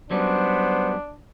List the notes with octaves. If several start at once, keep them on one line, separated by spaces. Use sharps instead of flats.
F#3 G3 B3 C#4 D4 C5